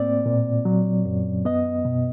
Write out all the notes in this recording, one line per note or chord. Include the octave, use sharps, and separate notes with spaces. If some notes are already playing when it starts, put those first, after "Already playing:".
Already playing: A2 A#3 C4 D5
A#2
F#3
F#2
B3 D#5
B2